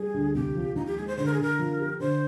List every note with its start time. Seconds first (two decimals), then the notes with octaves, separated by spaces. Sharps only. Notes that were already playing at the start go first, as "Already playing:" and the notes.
Already playing: G3 G#4
0.14 D2
0.34 C2 G4
0.55 F3
0.76 D#2 D#4
0.86 G4
0.97 G#3 G#4
1.07 C5
1.17 D3 C5
1.25 A#4
1.33 G#4
1.38 D3 A#4
1.59 F3
1.80 G4
2.00 D3 C5